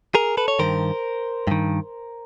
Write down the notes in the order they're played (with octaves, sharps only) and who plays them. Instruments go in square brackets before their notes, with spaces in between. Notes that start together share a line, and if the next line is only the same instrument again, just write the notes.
[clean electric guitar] G#4 A#4
A4 B4
C#5
G2 D#3 A#4 C5
G2 D#3